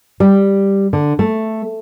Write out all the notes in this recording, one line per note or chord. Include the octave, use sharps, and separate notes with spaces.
G3
D3
A3